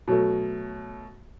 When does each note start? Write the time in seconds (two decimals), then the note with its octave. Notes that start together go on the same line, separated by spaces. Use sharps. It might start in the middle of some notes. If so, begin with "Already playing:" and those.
0.08 B2 F#3 A3